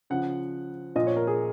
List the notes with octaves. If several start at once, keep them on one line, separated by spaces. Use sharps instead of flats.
C#3 F3 F#5
A#2 F3 D#5
C#5
A#4
G#4